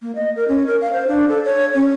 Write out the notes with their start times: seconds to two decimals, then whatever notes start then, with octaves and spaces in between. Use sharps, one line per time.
0.02 A#3
0.15 D#5
0.36 A#4
0.48 C#4
0.67 A#4
0.81 F5
0.93 C5
1.07 D4
1.29 A4
1.45 C#5
1.74 C#4